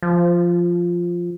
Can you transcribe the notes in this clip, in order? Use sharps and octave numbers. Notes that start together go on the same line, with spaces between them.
F3